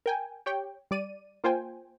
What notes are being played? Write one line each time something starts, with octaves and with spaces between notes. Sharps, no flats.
A#4 G5 G#5
G4 C#5 G5
G3 D5 D#7
A#3 F4 C5 G5 G#5